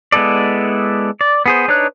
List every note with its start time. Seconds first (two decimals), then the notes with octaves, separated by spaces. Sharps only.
0.12 G#3 B3 E4 A4 D5
1.21 D5
1.46 B3 G#4 C5
1.68 D4 D#4 B4 C#5 F#6